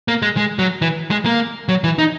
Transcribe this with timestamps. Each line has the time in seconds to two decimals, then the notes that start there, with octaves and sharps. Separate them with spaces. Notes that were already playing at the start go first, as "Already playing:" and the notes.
0.08 A#3
0.22 G#3
0.37 G#3
0.59 F#3
0.82 E3
1.11 G#3
1.26 A#3
1.69 F#3
1.84 E3
1.98 D#4